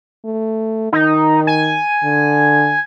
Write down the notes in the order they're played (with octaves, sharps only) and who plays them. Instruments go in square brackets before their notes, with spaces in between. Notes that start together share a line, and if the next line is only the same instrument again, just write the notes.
[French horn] A3
[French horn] D#3 [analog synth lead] D#4
[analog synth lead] G#5
[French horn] D3